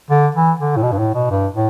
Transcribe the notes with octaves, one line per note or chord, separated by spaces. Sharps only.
D3
E3
D3
A2
B2
G2
A2
B2
G2
A2